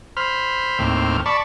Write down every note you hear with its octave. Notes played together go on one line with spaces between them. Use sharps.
C5 B5 F6
D#2 A2 C4 F6
D5 A5 B5 C#6